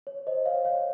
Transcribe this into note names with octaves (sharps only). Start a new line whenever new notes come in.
C#5
C5 D#5
C#5 F5
C#5 F5